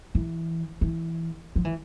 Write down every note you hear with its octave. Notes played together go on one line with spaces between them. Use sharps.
E3
E3
F3
E3